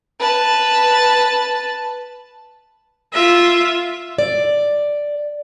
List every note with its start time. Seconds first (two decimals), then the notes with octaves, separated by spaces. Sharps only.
0.20 B4 A5
3.13 F4 E5
4.18 D5